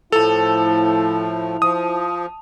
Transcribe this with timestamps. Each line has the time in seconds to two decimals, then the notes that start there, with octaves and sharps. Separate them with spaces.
0.12 A2 F3 E4 A4 A5 F7
1.62 F3 D#6